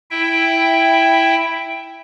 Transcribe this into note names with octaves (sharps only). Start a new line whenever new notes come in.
E4 E5 G5